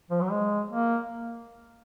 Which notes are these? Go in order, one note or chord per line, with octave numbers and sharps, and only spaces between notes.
F3
F#3
G#3
A#3